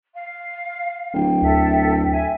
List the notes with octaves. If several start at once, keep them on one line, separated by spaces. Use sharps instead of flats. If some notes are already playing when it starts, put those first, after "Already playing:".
F5
D1 G5
D2 A4 E5
E5 G#5